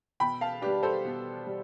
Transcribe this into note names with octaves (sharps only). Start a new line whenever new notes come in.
B2 G5 B5
F5 A5
G3 D4 G4 B4
A4 C5
B2
G3